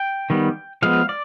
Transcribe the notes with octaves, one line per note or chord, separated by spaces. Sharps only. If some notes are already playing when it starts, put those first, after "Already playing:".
Already playing: G5
D#3 G3 B3
F3 G#3 B3 F5
D5